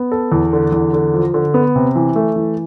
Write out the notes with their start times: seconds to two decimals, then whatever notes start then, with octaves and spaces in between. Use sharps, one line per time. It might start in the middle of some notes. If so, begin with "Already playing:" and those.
Already playing: B3
0.12 A4
0.32 E2
0.53 D3
0.72 E2
0.93 D3
1.14 F3
1.34 D3
1.54 B3
1.76 C3
1.95 E3
2.16 A3
2.36 E3